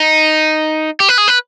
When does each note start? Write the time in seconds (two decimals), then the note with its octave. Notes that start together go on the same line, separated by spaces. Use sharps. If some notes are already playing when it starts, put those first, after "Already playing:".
Already playing: D#4
1.00 G4
1.09 B4
1.18 G#4
1.28 B4